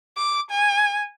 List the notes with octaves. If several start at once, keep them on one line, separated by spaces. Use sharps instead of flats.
D6
G#5